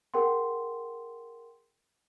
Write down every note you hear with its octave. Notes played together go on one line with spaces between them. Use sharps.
G#4 A#4 F#5 G5 C6